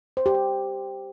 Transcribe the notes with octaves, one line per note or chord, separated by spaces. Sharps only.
C5
G4
C5